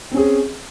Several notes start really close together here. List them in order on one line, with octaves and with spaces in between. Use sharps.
C4 C#4 G#4